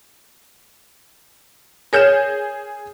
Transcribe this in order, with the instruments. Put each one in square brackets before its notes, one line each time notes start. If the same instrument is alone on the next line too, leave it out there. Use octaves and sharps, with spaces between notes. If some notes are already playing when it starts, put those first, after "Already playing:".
[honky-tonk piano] G#4 G6 E7 [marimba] A#4 C#5 F6